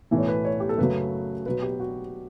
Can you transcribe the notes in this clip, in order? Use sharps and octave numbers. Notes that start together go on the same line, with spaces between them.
B1 A2 E3 A3
C#5
B4
C#5
G4
A4
F#2 C#3 F#3 A3 B4
B1 B2 F#3 B4
G4
F#4